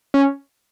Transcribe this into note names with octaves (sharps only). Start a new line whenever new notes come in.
C#4